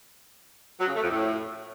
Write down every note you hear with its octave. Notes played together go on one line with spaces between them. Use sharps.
F#3
C#3
A3
F2
A2